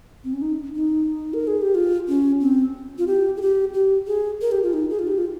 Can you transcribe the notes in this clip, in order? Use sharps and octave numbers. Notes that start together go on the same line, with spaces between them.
C4
C#4
D#4
D#4
A#4
G#4
G4
F4
C#4
C4
F4
G4
G#4
G4
G4
G#4
A#4
G4
F4
D#4
G#4
F4
G4
F4